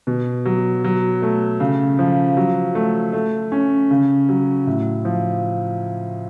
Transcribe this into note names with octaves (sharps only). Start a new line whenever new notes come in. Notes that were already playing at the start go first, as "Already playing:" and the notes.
B2
F#3
F#3
A3
C#3
F3
F#3
A3
A3
C#4
C#3
F#3
A2
F3